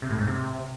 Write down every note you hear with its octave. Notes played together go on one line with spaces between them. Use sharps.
C3
A2
G#2
C3